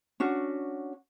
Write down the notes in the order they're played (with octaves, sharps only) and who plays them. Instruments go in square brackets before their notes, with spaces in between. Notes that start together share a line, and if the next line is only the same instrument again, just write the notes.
[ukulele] C#4 D4 F#4